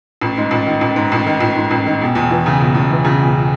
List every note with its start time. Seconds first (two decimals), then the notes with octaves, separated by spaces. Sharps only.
0.21 A1
0.37 G#2
0.51 A1
0.67 D#3
0.81 A1
0.96 G#2
1.12 A1
1.26 D#3
1.40 A1
1.56 G#2
1.71 A1
1.86 D#3
2.01 E1
2.15 E2
2.30 E3
2.46 C#3
2.60 E1
2.75 E2
2.90 E3
3.05 C#3
3.20 E1